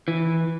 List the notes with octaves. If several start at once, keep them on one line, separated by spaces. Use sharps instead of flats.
E3